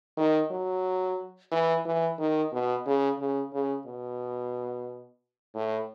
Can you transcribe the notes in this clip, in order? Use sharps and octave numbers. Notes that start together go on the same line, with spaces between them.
D#3
F#3
E3
E3
D#3
B2
C#3
C#3
C#3
B2
A2